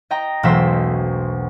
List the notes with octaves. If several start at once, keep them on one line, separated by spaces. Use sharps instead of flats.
D#5 G5 A#5
E1 B1 A3 C5 E6 B6